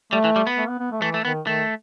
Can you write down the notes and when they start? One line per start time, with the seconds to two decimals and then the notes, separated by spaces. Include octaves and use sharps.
0.13 G3 A3
0.24 E3
0.36 G3
0.47 B3
0.58 A3
0.68 B3
0.79 B3
0.92 A3
1.02 E3 A3
1.14 A3
1.25 D#3 B3
1.47 D#3 A3